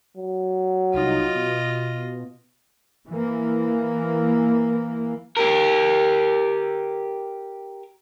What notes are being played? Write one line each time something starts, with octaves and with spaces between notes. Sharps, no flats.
F#3
C2 D#4 F4 D#5
B2
E3 A#3
G4 A#4